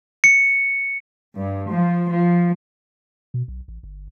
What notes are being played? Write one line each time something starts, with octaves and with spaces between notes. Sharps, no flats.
C#7
G2
F3
F3
B2
B1
A1
G1